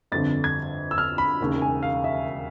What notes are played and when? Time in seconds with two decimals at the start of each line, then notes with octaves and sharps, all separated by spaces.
0.12 G1 F2 D3 A6
0.44 G#6
0.91 E6
0.98 F6
1.18 B5
1.40 E1 D#2 C#3
1.62 G#5
1.83 F5
2.04 E5